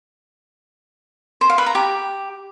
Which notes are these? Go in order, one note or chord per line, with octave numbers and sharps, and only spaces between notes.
C5
F5
B4
A#5
G4